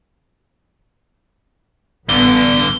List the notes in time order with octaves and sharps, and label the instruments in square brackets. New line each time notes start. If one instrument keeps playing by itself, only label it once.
[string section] A1 B3 [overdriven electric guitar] G2 D3 [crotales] G7